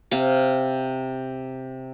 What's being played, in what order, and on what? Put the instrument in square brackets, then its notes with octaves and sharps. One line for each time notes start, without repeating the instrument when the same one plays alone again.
[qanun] C3 F5